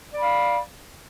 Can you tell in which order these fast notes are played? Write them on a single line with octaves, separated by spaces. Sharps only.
D5 B5 F5